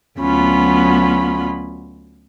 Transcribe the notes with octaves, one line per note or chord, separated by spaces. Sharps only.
D2 F#3 B3 C#4 F4 B5